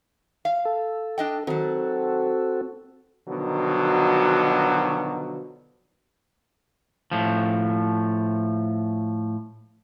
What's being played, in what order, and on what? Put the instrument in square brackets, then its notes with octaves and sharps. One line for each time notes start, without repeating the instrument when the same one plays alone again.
[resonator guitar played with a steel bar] F5
[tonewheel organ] A4
[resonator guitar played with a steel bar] D4 D#5 G5
[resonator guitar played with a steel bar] D#3 F#3 [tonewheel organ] C4 F#4 A4
[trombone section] B2 D3 D#3 F3 F#3
[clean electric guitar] A2 F3